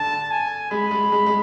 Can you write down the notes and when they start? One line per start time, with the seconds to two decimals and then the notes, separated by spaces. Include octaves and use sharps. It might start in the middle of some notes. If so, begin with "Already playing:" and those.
Already playing: D3 A5
0.31 G#5
0.71 G#3 B5
0.91 G#3
1.12 G#3
1.26 G#3